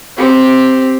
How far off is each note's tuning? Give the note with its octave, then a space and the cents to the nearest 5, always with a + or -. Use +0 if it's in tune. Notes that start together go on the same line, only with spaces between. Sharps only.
C4 +0 G4 +0